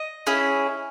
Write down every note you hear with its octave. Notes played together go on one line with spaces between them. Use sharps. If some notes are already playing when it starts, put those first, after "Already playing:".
Already playing: D#5
C#4 E4 G#4